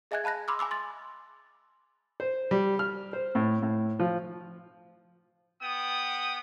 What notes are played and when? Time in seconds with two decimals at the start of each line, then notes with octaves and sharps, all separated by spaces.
0.11 G#4 D#5 E5 G#5 F#6 G#6
0.24 F5 A5 B5 F#6 A#6
0.48 B5 C6 D6 E6 F6
0.59 G#5 B5 D6 E6
0.71 C6 A6
2.20 C5
2.51 G3
2.79 F6
3.13 C5
3.35 A2
3.62 A2
4.00 F3
5.61 B3 G5 D#6